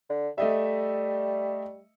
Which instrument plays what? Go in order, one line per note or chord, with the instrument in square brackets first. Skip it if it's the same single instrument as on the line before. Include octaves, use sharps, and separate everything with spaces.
[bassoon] D3
[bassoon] G3 [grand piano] A3 D#5 E5